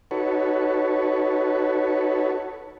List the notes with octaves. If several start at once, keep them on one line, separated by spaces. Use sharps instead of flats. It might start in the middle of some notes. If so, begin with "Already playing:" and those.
D#4 F#4 A4 B4 C#5